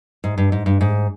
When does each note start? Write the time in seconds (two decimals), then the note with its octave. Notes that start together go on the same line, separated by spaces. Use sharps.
0.24 G#2
0.38 G2
0.52 G#2
0.66 G2
0.81 G#2